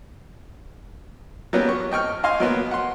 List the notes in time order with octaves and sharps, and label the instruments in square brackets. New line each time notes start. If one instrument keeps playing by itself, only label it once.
[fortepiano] F#3 G3 A#3 B3 C#4
C#6
D#5 G5 C#6 F6
D#5 F5 G#5 C6 F6
F#3 A#3 B3
F#5 C6